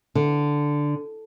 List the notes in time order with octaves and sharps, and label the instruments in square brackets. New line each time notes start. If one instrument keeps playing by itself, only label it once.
[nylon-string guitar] D3